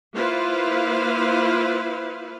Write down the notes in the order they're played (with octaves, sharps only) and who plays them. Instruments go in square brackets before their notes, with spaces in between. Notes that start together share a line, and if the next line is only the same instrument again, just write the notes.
[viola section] A#3 E4 F4 B4 C5 F5